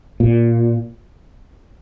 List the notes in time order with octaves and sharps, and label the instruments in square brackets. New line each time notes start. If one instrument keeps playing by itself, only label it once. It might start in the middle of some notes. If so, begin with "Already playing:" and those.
[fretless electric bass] A#2